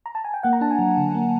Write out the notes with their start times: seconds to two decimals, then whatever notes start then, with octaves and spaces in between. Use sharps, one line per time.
0.06 A#5
0.15 A5
0.24 G#5
0.34 G5
0.43 A#3 F#5
0.53 A#5
0.61 D4 A5
0.71 G#5
0.79 F#3
0.97 D3
1.14 A#3